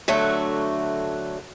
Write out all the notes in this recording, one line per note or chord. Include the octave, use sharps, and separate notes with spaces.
D3 F#3 A3 F#4